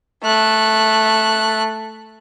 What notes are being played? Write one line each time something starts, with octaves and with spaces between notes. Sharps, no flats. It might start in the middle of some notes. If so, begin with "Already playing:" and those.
A3 F#6